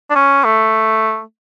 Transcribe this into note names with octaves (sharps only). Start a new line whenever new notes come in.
D4
C#4
A3